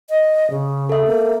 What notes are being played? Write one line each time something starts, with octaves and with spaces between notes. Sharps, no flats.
D#5
C#3
A4 E5
A#3